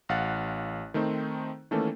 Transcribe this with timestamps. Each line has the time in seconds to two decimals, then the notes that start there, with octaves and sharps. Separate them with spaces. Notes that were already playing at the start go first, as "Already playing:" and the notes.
0.09 A1 F5 F#5 F#6 A6
0.94 D#3 A3 C4 D#4 C5
1.71 D#3 E3 A3 A#3 C#4 A4